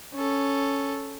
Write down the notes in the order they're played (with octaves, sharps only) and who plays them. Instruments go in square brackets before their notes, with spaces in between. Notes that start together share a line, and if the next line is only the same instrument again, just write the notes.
[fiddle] C#4 A4